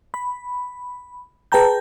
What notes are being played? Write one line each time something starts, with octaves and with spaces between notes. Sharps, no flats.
B5
G#4 B4 G5 A5 A#5 G6